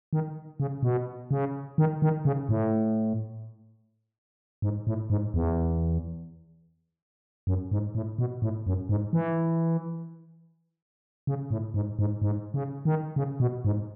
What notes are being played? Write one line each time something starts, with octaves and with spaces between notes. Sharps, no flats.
D#3
C#3
B2
C#3
D#3
D#3
C#3
A2
G#2
A2
G#2
E2
F#2
G#2
A2
B2
A2
F#2
G#2
E3
C#3
A2
G#2
G#2
G#2
C#3
D#3
C#3
B2
G#2